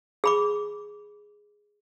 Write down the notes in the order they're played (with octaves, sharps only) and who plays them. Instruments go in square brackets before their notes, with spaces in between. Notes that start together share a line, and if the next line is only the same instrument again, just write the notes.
[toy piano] G#4 B5 D6